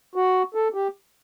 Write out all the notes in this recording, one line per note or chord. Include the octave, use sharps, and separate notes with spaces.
F#4
A4
G4